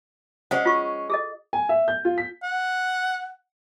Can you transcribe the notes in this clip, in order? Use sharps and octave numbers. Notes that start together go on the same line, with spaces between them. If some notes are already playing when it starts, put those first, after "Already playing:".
G#3 C#4 C5 F#5
F4 C#6
G#4 A4 D#5
G#5
E5
G6
F4
B6
F#5